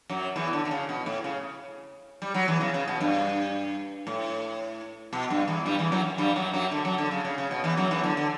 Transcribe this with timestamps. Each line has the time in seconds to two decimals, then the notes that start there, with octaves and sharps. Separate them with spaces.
0.09 F#2 F#3
0.36 E2 E3
0.53 D3
0.65 D3
0.71 C#3
0.89 B2
1.06 A2
1.24 C#3
2.22 G3
2.34 F#3
2.48 E2 E3
2.61 C#3
2.74 C#3
2.88 B2
3.00 G2
4.07 A2
5.13 B2
5.30 G2
5.48 E2 E3
5.66 G2 G3
5.79 E2 E3
5.92 F#2 F#3
6.18 G2 G3
6.36 F#2 F#3
6.53 F#2 F#3
6.71 D3
6.85 F#2 F#3
6.98 D3
7.11 C#3
7.25 C#3
7.38 C#3
7.51 B2
7.64 E2 E3
7.77 F#2 F#3
7.91 E2 E3
8.04 D3
8.17 D3